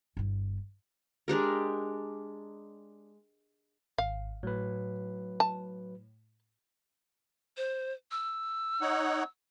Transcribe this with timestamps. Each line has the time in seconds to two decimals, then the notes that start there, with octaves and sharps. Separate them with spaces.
0.17 G1 E4
1.28 G#3 D4 G4 A#4
3.98 G#1 F5
4.43 A2 F#3 B4
5.40 A5
7.57 C5
8.11 E6
8.81 D#4 C#5 F#5